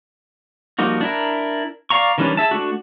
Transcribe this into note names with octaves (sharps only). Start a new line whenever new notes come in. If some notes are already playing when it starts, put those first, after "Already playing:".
F3 G3 A#3 D#4 F#4
D4 E4 A#4
D5 F5 A#5 C#6
D#3 E3 G3 C#4 D4
G#4 E5 A5
A3 D4 F#4